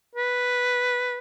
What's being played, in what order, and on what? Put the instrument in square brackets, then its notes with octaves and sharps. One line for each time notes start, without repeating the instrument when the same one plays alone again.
[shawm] B4